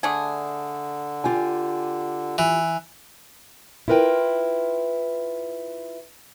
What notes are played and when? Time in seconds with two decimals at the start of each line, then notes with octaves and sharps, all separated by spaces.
0.03 D3 A3 D4 G#4
1.24 F4 G4 G#5
2.38 E3
3.88 E4 F4 A#4 B4 G5